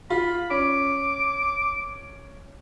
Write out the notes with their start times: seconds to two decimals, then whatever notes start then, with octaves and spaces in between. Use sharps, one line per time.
0.10 F4 B5
0.50 C#4 D6